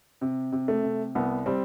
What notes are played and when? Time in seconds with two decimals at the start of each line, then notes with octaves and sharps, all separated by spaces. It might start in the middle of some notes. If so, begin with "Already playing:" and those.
0.21 C3
0.52 C3
0.68 A3
0.83 C3
1.15 C2 B3
1.46 G3 C4